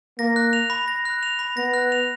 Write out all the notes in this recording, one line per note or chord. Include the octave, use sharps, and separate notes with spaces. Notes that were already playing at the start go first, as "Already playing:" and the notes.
A#3 A#6
F#6
F7
B5
A#6
F#6
F7
B5
B3 A#6
F#6
F7